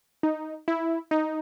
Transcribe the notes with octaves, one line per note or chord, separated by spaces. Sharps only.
D#4
E4
D#4